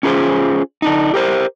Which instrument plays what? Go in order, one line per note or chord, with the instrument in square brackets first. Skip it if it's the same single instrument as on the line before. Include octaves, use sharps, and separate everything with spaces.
[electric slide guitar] C#4 F4 G#4 B4 C5
D3 D4 D#4
G4 A#4 C5